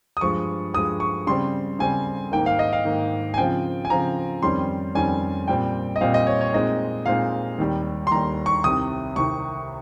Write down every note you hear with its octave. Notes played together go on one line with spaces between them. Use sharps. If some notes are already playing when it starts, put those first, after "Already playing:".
D#6
G2 F3 G#3 C#6
G2 F3 G#3 D#6
C#6
C#3 G3 C4 C6
C#3 G3 C4 G#5
G#2 D#3 A#3 G5
F5
D#5
F5
G#2 D#3 A#3
G#5
C#3 F3 C4 F4 G5
G#5
C#3 F3 C4 F4 A#5
F2 D#3 G3 C#4 C6
F2 D#3 G3 C#4 G#5
A#2 G3 C4 G5
D#5
A#2 G3 C4 F5
D#5
C#5
C#5
A#2 G#3 C4 D#4 D#5
A#2 G#3 C4 D#4 F5
D#2 D#3 G3
C6
D#2 D#3 G3 A#5
C#6
C2 C3 D#3 D#6
C2 C3 D#3 C#6